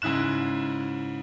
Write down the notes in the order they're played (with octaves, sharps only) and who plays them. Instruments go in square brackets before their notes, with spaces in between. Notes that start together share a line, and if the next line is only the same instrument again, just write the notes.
[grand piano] G#2 C#3 E4 F#6 E7